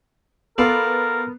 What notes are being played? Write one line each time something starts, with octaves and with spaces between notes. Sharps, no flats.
B3 F4 A4 A#4 D5